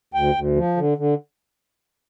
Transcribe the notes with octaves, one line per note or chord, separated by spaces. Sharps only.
D2 G5
D2
F3
D3
D3